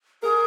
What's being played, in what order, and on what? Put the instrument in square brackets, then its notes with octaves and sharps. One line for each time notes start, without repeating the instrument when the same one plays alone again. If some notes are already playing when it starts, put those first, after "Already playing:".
[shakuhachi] G#4 [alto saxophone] A#4